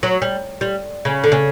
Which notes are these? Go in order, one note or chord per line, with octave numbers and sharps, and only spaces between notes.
F#3
G3
G3
C#3
D3
C#3